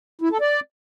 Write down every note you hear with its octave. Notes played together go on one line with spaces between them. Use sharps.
E4
A4
D5